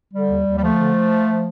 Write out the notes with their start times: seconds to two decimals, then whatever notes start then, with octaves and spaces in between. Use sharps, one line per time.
0.13 D3 G3
0.29 D#2
0.46 D#2
0.57 G3
0.62 D3 F3 A3
0.79 D3